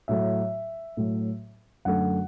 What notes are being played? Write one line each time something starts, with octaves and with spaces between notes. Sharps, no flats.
A2 F#3 A3 E5
A2 F#3 A3
F#2 D3 F#3 A3 F#5